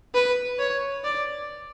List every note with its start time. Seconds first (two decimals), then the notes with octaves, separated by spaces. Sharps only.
0.14 B4
0.59 C#5
1.04 D5